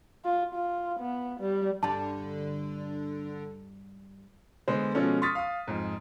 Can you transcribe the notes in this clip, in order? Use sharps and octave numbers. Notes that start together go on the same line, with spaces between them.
F4
F4
B3
G3
G2 D3 G3 A5
D3 G#3 B3 C5
B2 F3 G#3 C#4 A4
C6 C#6 D#6 F6 A6 B6
F5 D#6
F2 G#2